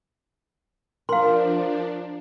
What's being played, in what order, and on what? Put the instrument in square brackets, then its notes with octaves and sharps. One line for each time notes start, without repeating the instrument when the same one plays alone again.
[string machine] F3 D4 [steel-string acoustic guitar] A#4 [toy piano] F5 C6